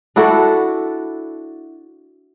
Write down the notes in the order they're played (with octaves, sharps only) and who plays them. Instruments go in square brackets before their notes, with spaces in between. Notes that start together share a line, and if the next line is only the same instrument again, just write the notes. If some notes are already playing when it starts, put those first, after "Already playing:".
[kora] D4 E4 F#4 A4